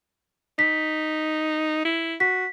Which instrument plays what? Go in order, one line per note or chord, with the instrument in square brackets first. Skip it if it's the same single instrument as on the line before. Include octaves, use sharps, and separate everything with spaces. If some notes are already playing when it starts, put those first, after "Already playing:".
[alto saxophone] D#4 [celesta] B6
[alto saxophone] E4
[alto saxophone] F#4 [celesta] B6